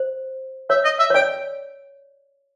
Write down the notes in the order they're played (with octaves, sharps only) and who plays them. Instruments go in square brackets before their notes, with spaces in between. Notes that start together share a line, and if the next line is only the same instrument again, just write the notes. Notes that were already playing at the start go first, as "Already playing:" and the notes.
Already playing: [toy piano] C5
[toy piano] C#5 [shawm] E5
[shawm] D#5
E5
[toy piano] C#5
[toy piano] D5 [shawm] G5